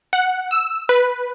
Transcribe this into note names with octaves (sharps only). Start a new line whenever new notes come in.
F#5
E6
B4